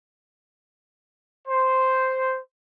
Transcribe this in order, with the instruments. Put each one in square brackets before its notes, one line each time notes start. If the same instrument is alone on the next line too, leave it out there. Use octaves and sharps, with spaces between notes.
[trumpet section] C5